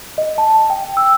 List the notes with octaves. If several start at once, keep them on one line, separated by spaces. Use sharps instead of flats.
D#5
A5
G5
E6